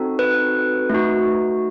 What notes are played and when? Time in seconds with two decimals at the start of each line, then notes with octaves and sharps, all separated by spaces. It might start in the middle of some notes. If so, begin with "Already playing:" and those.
Already playing: C4 D#4 F#4 A4
0.19 B4
0.89 A3 D#4 F#4